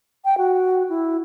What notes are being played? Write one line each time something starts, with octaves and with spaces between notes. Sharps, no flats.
G5
F#4
E4